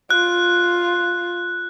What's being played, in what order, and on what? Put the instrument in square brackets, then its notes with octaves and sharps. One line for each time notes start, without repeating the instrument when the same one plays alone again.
[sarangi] F4 [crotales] F#6